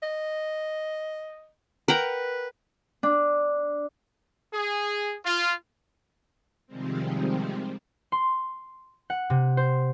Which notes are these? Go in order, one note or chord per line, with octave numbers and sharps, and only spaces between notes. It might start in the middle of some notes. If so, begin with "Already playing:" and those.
D#5
A#4 B4 F#5 G5
D4
G#4
F4
C3 D#3 F3 G3 G#3 C4
C6
F#5
C3
C5